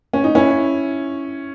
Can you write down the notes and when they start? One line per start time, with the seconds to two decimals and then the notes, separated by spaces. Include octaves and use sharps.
0.13 C#4
0.24 D#4
0.35 C#4 E4